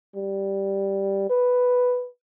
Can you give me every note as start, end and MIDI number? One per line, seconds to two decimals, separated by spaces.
0.15 1.26 55
1.30 2.08 71